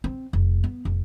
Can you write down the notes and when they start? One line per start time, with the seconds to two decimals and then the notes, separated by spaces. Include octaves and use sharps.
0.04 C4
0.33 F1
0.64 B3
0.85 F1